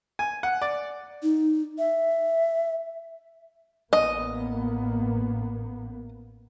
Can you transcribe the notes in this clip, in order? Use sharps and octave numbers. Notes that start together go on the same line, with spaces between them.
G#5
F#5
D5
D#4
E5
A1 A#3 B3 D#5